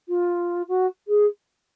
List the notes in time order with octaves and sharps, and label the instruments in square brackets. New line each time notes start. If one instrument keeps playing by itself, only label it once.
[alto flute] F4
F#4
G#4